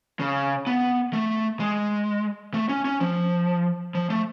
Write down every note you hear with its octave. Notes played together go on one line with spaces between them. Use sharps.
C#3
B3
A3
G#3
A3
C#4
C#4
F3
F3
A3